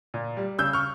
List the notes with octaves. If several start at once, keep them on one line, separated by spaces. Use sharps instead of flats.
A#2
G3
C#3 E6 G6
C#6 F6